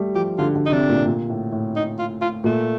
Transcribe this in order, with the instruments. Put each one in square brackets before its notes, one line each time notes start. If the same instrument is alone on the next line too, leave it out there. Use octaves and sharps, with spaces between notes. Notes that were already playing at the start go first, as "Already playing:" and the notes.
Already playing: [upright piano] G3 A3
[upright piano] F3 [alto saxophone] G4
[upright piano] D3 [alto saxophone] F4
[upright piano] D3
[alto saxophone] D#4
[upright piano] C3 [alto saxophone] D4
[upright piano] A#2
A#2
A2
A2
[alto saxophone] D#4
F4
F4
[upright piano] A#2 [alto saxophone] A3